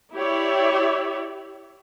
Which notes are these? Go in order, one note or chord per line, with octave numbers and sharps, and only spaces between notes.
E4 G4 C#5 D5 E5